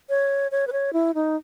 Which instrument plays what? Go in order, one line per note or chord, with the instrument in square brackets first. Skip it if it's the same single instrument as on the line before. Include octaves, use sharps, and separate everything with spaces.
[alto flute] C#5
C#5
B4
C#5
E4
D#4